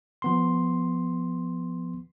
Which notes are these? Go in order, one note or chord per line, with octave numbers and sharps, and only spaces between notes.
F3 B3 C6